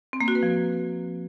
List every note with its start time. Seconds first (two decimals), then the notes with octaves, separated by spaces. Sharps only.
0.13 C4
0.21 A#3
0.28 F#4
0.35 B4
0.43 F3